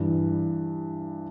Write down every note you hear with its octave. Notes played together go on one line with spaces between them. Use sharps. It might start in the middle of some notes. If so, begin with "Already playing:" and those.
Already playing: G2 E3